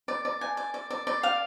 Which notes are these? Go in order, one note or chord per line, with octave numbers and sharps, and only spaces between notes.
D5
D5
G#5
D5
D5
D5
D5
F5